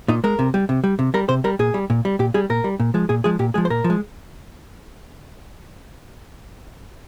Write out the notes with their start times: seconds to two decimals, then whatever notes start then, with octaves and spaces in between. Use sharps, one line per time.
0.08 A#2 D#4
0.24 G#3 A#4
0.39 C3
0.54 G3
0.69 C3
0.84 G3
0.99 C3
1.14 G3 A#4
1.29 C3 C5
1.44 G3 A#4
1.59 A#2 G#4
1.74 G3
1.90 A#2
2.05 G3
2.19 A#2 G4
2.34 G3 G#4
2.50 A#2 A#4
2.64 G3
2.80 A#2
2.94 F3 G#3
3.09 A#2 G#4
3.24 F3 G#3 G#4
3.39 A#2 G4
3.54 F3 G#3 G#4
3.65 C5
3.70 A#2 A#4
3.84 F3
3.90 G#3